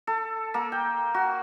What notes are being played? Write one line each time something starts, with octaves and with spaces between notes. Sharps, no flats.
A4
A#3
G5
F#4